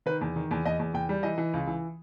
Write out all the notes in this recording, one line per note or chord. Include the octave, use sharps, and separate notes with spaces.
D#3 B4
E2
D#3
E2
E2 D#5
E2
E2 G5
G3
E3 D#5
E3
C#2
E3